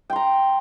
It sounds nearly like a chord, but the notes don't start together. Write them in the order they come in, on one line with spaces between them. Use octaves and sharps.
G5 C6 A#5